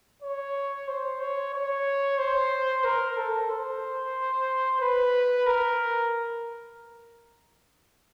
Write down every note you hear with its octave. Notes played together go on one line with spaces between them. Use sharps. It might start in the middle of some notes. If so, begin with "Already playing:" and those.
C#5
C5
C#5
C#5
C5
A#4
A4
C5
B4
A#4